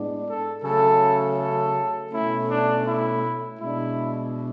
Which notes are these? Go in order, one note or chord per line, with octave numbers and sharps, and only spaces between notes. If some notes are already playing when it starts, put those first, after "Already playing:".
Already playing: A2 G#3 B3 D4
A4
C#3 F#3 A3 C#4 A4
A4
B2 A3 C#4 E4
D4
E4
B2 G#3 D4 E4